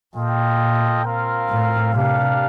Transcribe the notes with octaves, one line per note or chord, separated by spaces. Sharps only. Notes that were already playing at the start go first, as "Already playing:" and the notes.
A#2 F4 A4 D#5 G5
C4 F4 A#4 F5
A2
C3 D4 G4 A#4 F5